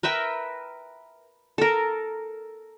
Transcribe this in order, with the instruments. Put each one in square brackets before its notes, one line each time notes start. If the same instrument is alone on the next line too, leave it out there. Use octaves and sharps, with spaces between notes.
[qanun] A#4 B4 E5 G5
A4 A#4